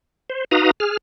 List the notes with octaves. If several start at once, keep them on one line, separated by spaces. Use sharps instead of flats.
C5
D#4 F#4 B4 F5 A#5 D#6
G#4 F6